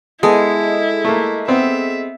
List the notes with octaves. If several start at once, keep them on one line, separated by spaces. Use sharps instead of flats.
G#3 B3 E4 G#4 A4 D#5
A3 A#3
B3 C4 E5